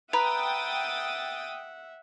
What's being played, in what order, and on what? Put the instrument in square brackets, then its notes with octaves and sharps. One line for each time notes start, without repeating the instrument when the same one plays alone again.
[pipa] B4 [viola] E5 F#5 [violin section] G5 D#6 A6 [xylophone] A#5